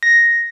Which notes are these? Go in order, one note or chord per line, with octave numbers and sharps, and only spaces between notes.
A#6